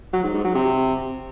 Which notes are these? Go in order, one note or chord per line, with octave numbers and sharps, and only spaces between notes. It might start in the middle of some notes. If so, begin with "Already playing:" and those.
F#3
G#2
G#2
F#3
C3